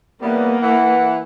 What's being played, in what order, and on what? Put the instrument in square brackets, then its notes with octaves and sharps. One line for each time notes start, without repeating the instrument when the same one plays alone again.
[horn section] C#3 E3 G3 [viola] A#3 [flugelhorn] B3
[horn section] E3 [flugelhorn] F#5